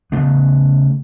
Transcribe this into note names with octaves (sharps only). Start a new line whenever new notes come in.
C#3 A3 B3